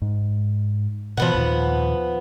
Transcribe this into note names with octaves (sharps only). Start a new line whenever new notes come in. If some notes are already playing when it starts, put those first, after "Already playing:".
G#2
B2 E3 F3 B3 F#5
D#2 A#2 D#3